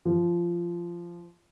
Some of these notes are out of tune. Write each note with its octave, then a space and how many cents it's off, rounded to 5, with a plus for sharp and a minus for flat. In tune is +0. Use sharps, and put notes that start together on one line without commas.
F3 -15